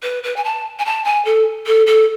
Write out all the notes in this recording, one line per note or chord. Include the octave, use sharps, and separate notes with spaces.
B4
B4
G#5
A5
G#5
A5
G#5
A4
A4
A4